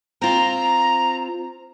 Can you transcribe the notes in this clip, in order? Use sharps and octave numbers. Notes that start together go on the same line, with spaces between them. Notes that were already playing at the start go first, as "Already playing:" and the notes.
C4 F4 A#5